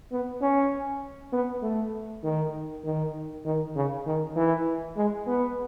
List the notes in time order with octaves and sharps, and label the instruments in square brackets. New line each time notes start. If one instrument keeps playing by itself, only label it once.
[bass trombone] B3
C#4
B3
A3
D#3
D#3
D#3
C#3
D#3
E3
G#3
B3